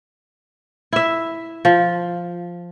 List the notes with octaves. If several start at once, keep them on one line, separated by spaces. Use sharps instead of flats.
E4 E5
F3